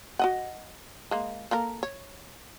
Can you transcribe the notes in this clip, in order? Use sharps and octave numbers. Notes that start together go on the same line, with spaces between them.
F#4 D#5 F#5
G#3 A#3
A#3 A4 A#4
C#5